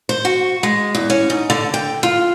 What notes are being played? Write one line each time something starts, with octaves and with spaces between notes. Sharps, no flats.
C5
F#4
G#3
E2
C#4
G#2
D3
G5
F4